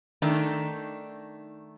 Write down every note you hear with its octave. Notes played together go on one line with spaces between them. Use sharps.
D#3 A3 D4 D#4